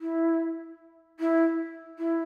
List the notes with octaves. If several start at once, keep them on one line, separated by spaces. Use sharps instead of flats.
E4
E4
E4